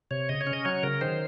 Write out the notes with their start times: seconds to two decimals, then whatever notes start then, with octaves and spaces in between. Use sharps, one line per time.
0.11 C3 C#5
0.29 C#3 D#5
0.41 C#5
0.47 C#4
0.53 D#5
0.65 F#3 C#5
0.83 C#3 A#4
1.01 D#3 C5